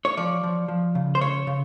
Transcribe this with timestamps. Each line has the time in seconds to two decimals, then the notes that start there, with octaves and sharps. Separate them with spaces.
0.05 C#5
0.17 F3 D5
0.44 F3
0.68 F3
0.95 C#3
1.15 C5
1.21 C#3 C#5
1.47 C#3